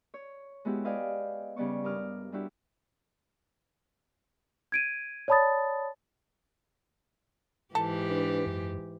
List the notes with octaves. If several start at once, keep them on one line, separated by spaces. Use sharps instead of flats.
C#5
G#3 B3 E4 F#4 G4
B4 D5 D#5 F5 G5 G#5
C#3 G3 B3 D5 C#6
G2 A#4 D6 D#6 F6
G3 D4 E4 F#4 G4
G#6 D7 D#7
C#5 D5 A5 B5 D#6 A6
G#2 E3 G4 A4
D4 B4
F#2